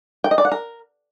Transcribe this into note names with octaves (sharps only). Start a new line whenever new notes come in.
G5
D#5
D5
F#5
A#4